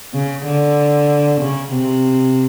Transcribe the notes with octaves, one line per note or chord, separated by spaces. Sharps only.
C#3
D3
C#3
C3